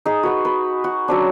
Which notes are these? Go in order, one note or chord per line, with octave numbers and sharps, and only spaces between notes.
D#4 G#4
F#4 B4 F#5
B4
F#4
F#3 C#4 D4